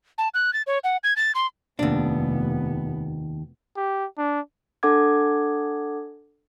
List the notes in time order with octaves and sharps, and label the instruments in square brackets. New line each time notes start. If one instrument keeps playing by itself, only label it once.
[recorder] A5
F#6
A6
C#5
F#5
G#6
A6
C6
[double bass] F1 B3 [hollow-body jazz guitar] D#2 D4
[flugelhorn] G4
D4
[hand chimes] D4 A4 F#5 D6 G#6